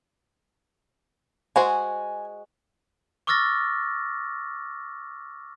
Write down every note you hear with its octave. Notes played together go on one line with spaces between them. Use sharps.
G#3 F#4 C5 G#5
C#6 D6 E6 F6 A6 A#6